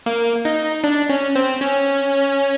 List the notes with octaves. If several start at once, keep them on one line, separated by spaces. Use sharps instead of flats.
A#3
D#4
D4
C#4
C4
C#4